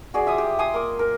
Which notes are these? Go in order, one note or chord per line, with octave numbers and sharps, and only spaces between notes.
F#4 G#4 D5
F4 E5 G#5 D#6
G4
G5 G#5 C6 D#6
A#3 D6
A#4